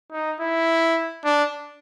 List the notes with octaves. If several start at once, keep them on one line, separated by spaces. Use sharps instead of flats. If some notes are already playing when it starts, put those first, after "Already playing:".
D#4
E4
D4